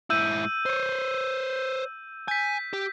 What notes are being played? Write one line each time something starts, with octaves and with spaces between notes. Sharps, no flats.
G#2 E4 E6 G6 D#7
C5 C#5
G#5 G6 B6
G4